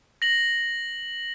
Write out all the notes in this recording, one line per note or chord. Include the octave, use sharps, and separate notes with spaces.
A#6 F#7